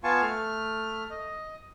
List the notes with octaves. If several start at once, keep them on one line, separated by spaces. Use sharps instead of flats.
B3 F4 F5 G#5 A5 C#6
A3 F6
D#5